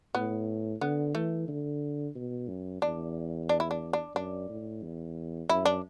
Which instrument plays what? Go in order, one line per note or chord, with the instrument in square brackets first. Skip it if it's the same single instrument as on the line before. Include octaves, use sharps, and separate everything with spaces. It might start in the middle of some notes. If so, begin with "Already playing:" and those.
[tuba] A2 [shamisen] B3
[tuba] D3 [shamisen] B3
[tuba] E3 [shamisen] A3
[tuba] D3
B2
F#2
[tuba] E2 [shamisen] D4
[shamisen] D4
E4
D4
D4
[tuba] F#2 [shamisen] D4
[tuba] A2
E2
[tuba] F#2 [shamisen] E4
[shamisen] D4